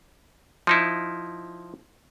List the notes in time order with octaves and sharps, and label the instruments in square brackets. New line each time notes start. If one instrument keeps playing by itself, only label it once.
[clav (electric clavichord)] F3 D#4 E4